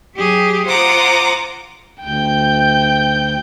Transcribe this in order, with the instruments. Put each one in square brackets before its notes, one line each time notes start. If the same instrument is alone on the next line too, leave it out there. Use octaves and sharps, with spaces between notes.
[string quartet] F#3 G4 G#4
F4 C5 F#5 A#5 D6 D#6
[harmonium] D2 [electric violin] G5 G6